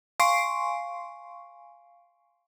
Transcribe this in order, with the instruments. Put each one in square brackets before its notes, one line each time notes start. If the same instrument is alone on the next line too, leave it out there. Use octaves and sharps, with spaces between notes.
[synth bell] F5 G#5 C6 C#6 C7 D7